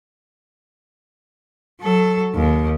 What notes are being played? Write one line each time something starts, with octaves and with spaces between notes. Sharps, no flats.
F#3 A4
D#2